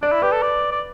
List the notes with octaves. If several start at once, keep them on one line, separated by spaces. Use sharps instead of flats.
D4 D5
E4
G4 B4
A4
D5
D5